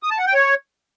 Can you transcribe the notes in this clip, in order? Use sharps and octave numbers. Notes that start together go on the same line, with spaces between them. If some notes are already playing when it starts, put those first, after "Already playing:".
D#6
A5
F#5
G5
C#5